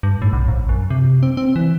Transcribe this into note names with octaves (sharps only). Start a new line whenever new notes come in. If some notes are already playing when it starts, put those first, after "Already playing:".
G2
A2
B1
A#1
F#2
C3
C4
C4
E3